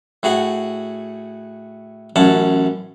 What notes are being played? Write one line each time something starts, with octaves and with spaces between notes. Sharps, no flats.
A2 F#4 G#4 F#5 G#5
A1 F#2 C#4 F#5 A5